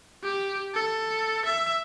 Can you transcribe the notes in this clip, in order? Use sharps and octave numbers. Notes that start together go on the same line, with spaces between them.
G4
A4
E5